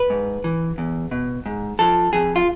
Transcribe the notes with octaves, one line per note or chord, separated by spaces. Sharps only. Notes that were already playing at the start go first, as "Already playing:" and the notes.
Already playing: B4
G#2
E3
E2
B2
G#2
F3 A4
F2 G#4
F4